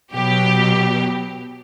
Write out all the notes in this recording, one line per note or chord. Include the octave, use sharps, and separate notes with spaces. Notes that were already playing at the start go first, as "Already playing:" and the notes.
B2 F#3 G4